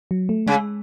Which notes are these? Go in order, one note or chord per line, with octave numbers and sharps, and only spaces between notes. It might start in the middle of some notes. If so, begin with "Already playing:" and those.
F#3
A3
C#3 G#3